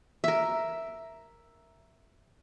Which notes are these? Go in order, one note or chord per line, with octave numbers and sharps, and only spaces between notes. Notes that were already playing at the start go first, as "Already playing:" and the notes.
A#4 E5